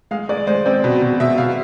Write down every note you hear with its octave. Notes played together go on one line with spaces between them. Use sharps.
G#3 F5
G#3 D5
G#3 C5
C4 D5
B2
B2
B2 E5
B2 F5